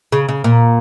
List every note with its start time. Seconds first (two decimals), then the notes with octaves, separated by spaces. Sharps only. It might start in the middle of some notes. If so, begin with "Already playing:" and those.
0.12 C#3
0.29 C#3
0.44 A#2